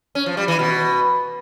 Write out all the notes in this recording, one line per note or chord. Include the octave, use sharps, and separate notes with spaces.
C#4
F3
G3
E3
B2